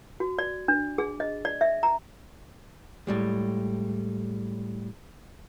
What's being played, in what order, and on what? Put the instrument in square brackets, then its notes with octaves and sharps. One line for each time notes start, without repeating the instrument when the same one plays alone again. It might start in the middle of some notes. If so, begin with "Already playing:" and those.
[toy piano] F#4
D5
D4
G#4
D#5
D5
E5
A#5
[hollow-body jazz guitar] A2 G3 G#3